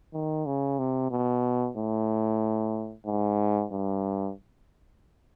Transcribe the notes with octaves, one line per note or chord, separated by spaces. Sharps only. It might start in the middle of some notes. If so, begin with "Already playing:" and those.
D#3
C#3
C3
B2
A2
G#2
G2